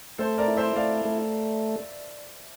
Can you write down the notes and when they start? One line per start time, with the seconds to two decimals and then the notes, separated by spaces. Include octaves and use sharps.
0.18 A3 A4 C5
0.38 A#4 D5
0.48 E4
0.57 C5 E5
0.76 A3 D5 F5
1.05 A3